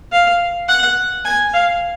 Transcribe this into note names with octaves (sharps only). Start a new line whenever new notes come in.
F5
F#5
G#5
F5